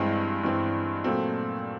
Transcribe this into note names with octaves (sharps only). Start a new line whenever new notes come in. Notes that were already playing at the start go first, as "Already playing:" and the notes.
Already playing: G2 E3 G#3 C4
G2 E3 G#3 C4
A#2 F#3 A3 C4